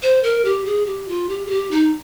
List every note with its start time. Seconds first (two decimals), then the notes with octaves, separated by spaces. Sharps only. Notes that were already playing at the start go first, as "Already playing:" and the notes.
0.02 C5
0.23 A#4
0.45 G4
0.66 G#4
0.86 G4
1.08 F4
1.29 G4
1.46 G#4
1.50 G4
1.71 D#4